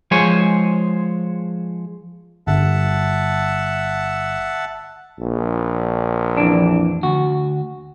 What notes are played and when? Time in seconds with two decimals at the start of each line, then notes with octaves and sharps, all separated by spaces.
0.11 F3 G#3 C5 C#5 G#5
2.47 G1 E5 F#5 A5
5.19 A#1
6.37 F2 E3 D4
7.03 D2 F#4